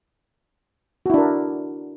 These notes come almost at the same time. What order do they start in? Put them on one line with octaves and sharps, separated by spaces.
F#4 E4 D4 A#4